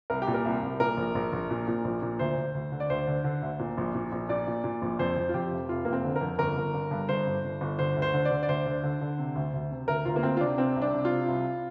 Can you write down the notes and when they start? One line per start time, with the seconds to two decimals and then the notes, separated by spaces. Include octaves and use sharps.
0.10 C2 A#4
0.22 G4
0.27 A#2
0.34 A#4
0.45 C2
0.63 C2
0.80 A#2 A#4
0.97 A#1
1.15 A#1
1.33 A#1
1.50 A#2
1.68 A#2
1.84 A#1
2.02 A#2
2.19 D2 C5
2.37 D2
2.54 D2
2.72 D3
2.80 D5
2.90 D2 C5
3.07 D3
3.24 D3
3.42 D2
3.59 A#2
3.77 A#1
3.95 A#2
4.12 A#1
4.29 A#2 D5
4.47 A#2
4.64 A#2
4.82 A#1
4.99 F2 C5
5.17 F2
5.29 F4
5.34 F2 G4
5.52 F1
5.69 F1 F4
5.85 F1 A#3
5.93 C4
6.04 D3
6.16 A#4
6.21 F2
6.39 G1 A#4
6.57 G1
6.74 G1
6.91 G2
7.09 G1 C5
7.26 G1
7.44 G1
7.61 G1
7.79 D3 C5
7.96 D2
8.02 C5
8.13 D3
8.25 D5
8.31 D3
8.43 D5
8.48 D2 C5
8.66 D3
8.83 D3
9.01 D3
9.19 C3
9.35 D2
9.53 D2
9.71 C3
9.88 D2 A#4
10.05 D2 F4
10.16 A#3
10.23 D2 C4
10.37 F4
10.41 C3 D4
10.58 C3 C4
10.76 C2
10.82 D4
10.93 C3
11.05 F4
11.11 C3
11.28 C2